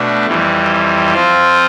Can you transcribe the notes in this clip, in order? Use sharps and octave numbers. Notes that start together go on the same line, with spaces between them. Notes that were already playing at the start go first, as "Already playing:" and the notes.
Already playing: B2 A3 D4
F2 E3 G3
F3 C4 F4